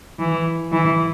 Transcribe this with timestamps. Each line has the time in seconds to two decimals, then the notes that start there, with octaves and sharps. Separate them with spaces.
0.20 E3
0.72 E3